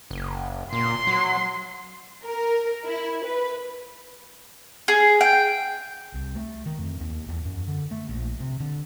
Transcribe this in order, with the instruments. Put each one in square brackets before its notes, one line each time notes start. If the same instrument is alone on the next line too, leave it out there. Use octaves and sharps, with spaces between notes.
[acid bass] F#1
[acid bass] A#2 [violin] C6
[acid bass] F#3
[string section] A#4
E4
B4
[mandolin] G#4
G5
[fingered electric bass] C2
A3
D#3
F2
D#2
E2
F#2
D3
A3
A#1
C3
D3